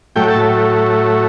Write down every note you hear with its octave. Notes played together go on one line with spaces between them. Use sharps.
A2 F#3 A3 G5
A5